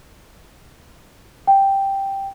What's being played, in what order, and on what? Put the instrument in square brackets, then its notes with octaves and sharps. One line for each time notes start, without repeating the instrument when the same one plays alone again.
[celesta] G5